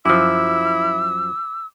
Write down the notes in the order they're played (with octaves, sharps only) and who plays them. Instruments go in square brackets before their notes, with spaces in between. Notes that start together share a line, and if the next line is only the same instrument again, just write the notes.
[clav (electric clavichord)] F#2 F3 [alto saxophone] E4 [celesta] D6 [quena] E6